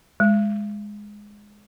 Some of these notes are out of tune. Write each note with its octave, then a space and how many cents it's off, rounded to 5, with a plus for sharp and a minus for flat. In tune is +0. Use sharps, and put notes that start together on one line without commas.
G#3 +0